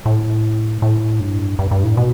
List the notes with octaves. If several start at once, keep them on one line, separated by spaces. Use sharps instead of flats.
A2
A2
G2
G2
G2
A2
B2